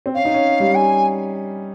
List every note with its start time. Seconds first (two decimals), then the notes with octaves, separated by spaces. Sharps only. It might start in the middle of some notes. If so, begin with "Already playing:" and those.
0.06 C4
0.14 C#4 F5
0.25 D#4
0.34 C#4
0.60 G3
0.74 G#5